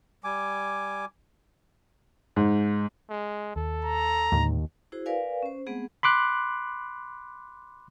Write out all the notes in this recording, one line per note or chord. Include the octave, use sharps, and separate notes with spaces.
G3 G#5 D6
G#2
G#3
D#2 A4
A#5
D#2 A2 D3 G#3
E4 F#4 G#4 C5
A#4 B4 D5 F5 G#5
C#4 C5
G#3 A3 B3 C4 G#4 F#5
B5 C6 D6 F#6